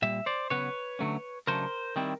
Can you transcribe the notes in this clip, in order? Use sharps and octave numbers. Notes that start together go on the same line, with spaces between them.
A#2 G3 E5
C5 D5
C#3 F#3 B3 B4 C#5
D3 F#3 A3 C#4
C#3 F#3 A3 D4 A#4 C5
D#3 G3 C4 E4